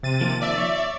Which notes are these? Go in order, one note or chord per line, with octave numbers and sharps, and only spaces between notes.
C3 A6 D#7
D#3 F3 A#3
D5 E5
C#5